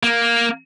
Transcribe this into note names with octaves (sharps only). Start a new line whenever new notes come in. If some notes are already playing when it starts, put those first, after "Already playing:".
A#3